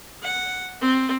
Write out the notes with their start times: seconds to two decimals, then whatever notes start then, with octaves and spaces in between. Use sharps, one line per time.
0.22 F#5
0.81 C4